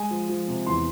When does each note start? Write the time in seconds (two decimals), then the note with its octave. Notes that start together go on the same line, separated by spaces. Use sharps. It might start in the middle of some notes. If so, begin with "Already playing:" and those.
Already playing: G#3 G#5
0.11 F3
0.29 F3
0.48 C3
0.67 E2 C6